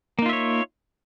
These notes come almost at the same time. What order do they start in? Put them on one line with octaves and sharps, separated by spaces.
A#3 D#4 F4 E5 C#5